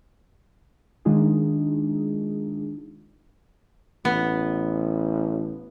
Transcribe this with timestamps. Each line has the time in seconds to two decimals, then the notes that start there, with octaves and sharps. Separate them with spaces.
1.05 D#3 G#3 D4 D#4 F4 G#4
4.05 A1 B3